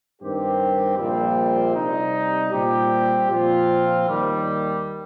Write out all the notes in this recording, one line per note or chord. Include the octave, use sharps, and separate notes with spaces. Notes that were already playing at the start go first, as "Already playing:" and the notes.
G2 D#3 C4 G4
A#1 A#2 G3 C4
C3 G3 D#4
A#2 G3 C4 G4
A#2 F3 C4 F4
D#2 D#3 G3